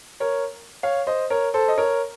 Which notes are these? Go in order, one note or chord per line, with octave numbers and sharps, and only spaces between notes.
A#4 C#5
C#5 F5
C5 D#5
A#4 C#5
A4 C5
D#5
A#4 C#5